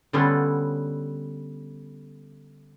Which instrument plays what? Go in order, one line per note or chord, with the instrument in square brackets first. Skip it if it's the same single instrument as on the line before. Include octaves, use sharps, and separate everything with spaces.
[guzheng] D3 G3 B3 C#4 F4 A4